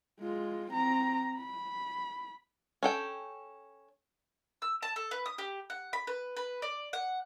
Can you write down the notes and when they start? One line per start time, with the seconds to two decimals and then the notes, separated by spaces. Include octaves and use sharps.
0.20 G#3 F4
0.71 C4 A#5
1.36 B5
2.83 C#4 A4 G5
4.62 E6
4.82 A5
4.96 A4
5.11 B4
5.26 D#6
5.38 G4
5.70 F#5
5.93 B5
6.07 B4
6.36 B4
6.62 D5
6.93 F#5